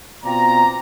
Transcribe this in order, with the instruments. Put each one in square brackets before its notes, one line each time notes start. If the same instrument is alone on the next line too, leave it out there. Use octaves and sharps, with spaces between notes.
[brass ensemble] B2 C4 F4 D5 A#5